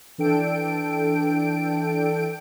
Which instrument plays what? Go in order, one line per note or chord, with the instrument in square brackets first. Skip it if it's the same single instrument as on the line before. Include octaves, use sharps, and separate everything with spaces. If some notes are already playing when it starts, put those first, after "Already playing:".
[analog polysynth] E3 D4 A4 G5 D7